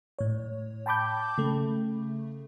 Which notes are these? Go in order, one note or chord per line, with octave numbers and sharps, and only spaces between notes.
A2 C#5
G5 A5 B5 D6 G6
C#3 A3